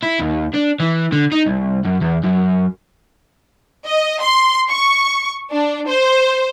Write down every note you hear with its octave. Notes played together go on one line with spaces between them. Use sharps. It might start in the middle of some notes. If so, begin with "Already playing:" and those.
E4
D#2
D4
E3
D3
D#4
C2
F#2
E2
F#2
D#5
C6
C#6
D4
C5